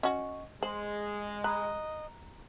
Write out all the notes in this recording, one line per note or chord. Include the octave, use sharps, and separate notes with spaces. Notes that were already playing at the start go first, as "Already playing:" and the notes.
C#4 F#4 D#5 C#6
G#3 C5 F#7
D#5 A#5 B5 F#6